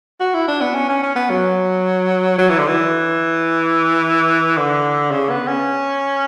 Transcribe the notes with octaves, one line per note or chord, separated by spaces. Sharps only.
F#4
E4
D4
B3
C#4
C#4
C#4
B3
F#3
F#3
E3
D3
E3
D3
C#3
B3
C#4